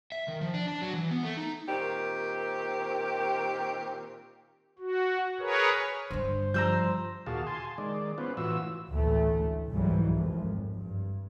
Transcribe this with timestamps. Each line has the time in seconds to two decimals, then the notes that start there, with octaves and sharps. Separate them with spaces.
0.12 E5
0.28 D#3
0.41 F3
0.54 D4
0.68 D4
0.81 F#3
0.94 E3
1.11 B3
1.23 A3
1.37 D#4
1.68 A#2 D#3 C4 G4
4.79 F#4
5.40 G#4 A#4 B4 C#5
6.11 G2 D3 C5
6.54 F3 G3 A#5 E6 G6
7.26 D#2 A#2 F#4 G#4 F5 A5
7.47 G#5 A5 C6
7.78 D#3 G#3 D5
8.18 B3 C#4 F4 B4 C5
8.37 A2 E3 F4 F#4 B4 E6
8.92 A1 D2 E3 A3
9.69 C2 F2 G#2 E3 F#3 G3
10.15 G#1 F2
10.74 G2